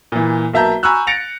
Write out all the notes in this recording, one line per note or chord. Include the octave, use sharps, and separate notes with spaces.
A#2 E3
B1 A#3 E5 A5 A#5 G6
G#5 A#5 B5 C#6 E6 F#6
A6 A#6 C#7 D7 F7